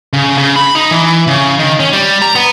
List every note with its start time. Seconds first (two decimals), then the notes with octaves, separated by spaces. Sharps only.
0.13 C#3
0.38 C#3
0.56 B5
0.75 D#4
0.91 E3
1.27 C#3
1.59 D#3
1.80 C#4
1.93 G3
2.22 A#5
2.35 B3